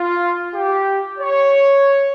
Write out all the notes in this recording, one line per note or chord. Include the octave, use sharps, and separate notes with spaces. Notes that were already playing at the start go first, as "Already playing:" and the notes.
Already playing: F4
G4
C#5